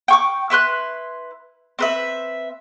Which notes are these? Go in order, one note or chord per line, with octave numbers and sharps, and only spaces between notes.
G5 C#6 D6
E4 B4 C6 F#6
C4 B4 E5